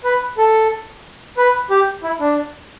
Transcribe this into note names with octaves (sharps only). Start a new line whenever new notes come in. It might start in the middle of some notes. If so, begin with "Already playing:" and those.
B4
A4
B4
G4
E4
D4